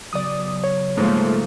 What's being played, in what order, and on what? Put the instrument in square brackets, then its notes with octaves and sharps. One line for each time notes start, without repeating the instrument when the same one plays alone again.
[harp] C#3 F#3 B3 [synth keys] D5 D#6
[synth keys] C#5
[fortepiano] G#2 [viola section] F3 A3 A#3